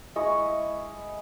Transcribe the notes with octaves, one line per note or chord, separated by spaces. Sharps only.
G#3 E4 D#5 C#6